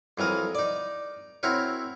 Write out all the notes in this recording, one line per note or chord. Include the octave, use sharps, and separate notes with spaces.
F2 E3 F#3 A#4 D#6
D#4 D5
C4 E4 F#4 A#4 C#5